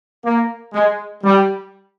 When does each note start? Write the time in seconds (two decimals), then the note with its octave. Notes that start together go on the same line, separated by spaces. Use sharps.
0.24 A#3
0.73 G#3
1.24 G3